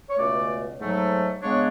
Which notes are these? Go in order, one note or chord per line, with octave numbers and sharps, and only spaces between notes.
C#5
C#2 B2 A3 C#4 D5
G#2 F#3 A3
C#3 G#3 B3 D4 C#5